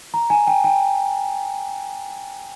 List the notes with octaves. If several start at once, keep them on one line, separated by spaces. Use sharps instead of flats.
A#5
G#5
G5
G5